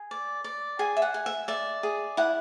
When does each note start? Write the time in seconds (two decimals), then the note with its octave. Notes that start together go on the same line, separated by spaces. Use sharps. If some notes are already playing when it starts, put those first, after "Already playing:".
Already playing: G#4
0.11 D5
0.44 D5
0.79 G#4 G#5
0.97 E5
1.02 F#5
1.14 G#4
1.26 E5
1.48 D5 E5
1.83 G#4
2.17 E4 F#5